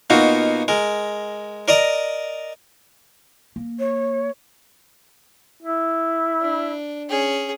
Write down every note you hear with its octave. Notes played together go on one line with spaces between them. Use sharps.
B2 A#3 D#4 F4 F#4
G#3 A#4
A#4 D5 D#5 A#5
A#3
C#5
E4
D4
C#4 G#4